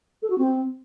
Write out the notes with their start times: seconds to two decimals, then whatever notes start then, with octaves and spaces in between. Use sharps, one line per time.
0.22 A4
0.30 F#4
0.38 C4